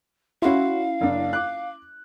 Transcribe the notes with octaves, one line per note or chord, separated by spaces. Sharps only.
C#4 E4 F#4 F5 C6
F#1 D4
D6 F#6